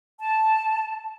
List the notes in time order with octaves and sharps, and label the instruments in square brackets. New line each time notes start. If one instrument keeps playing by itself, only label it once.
[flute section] A5